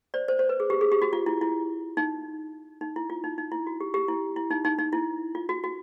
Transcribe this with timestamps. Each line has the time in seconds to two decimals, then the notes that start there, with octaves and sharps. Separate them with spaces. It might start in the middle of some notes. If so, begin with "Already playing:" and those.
0.14 C5 D5
0.28 C5
0.39 C5
0.49 B4
0.60 G#4
0.70 G4
0.81 G#4
0.92 G4
1.02 F#4
1.13 F4
1.26 E4
1.41 E4
1.97 D#4
2.81 D#4
2.96 E4
3.10 F4
3.24 D#4
3.38 D#4
3.52 E4
3.67 F#4
3.80 G4
3.94 G4
4.08 E4
4.36 E4
4.51 D#4
4.65 D#4
4.79 D#4
4.93 E4
5.35 F4
5.49 F#4
5.64 F#4